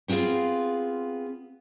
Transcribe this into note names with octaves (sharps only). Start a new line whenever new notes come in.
B3 C4 F4 G#4 F5